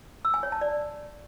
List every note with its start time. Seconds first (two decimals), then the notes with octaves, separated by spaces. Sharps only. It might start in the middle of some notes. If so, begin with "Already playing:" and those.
0.25 E6
0.34 G#5
0.43 C#5
0.52 A5
0.61 D5